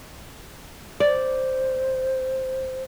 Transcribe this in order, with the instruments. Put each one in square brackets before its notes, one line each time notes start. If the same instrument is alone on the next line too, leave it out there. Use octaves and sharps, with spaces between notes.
[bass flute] C5 [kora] D5